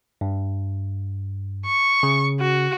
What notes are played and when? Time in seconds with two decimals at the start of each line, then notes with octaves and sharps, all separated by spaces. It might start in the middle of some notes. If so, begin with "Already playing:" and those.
0.21 G2
1.65 C#6
2.03 C#3
2.40 F#4